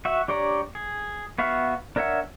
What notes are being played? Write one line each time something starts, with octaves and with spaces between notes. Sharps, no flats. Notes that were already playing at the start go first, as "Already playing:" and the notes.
F#4 E5
D4 G4 C#5 D5 A#5
G#4
B3 F#4 E5 F5
D4 A#4 C#5 E5 F#5